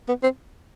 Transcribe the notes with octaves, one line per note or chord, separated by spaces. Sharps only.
B3
C4